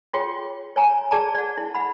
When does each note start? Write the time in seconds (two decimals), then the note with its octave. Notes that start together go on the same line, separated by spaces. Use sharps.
0.13 F4 F#4 G#4 C#5 G5
0.76 C#5 G#5 A#5
1.11 G#4 D5 A5 A#5
1.34 D5 F#5
1.58 E4
1.75 F#5 B5